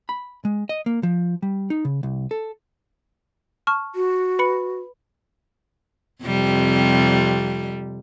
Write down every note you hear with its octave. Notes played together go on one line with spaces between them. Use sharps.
B5
G#3
D#5
A#3
F3
G3
D#4
C#3
C2
A4
A5 C#6 F6
F#4
B4 B5 C#7
F2 C3 G3